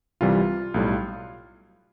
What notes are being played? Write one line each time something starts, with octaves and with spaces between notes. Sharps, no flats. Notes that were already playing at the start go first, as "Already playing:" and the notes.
C2 C3 E3 G3 F4
B1 A2 G3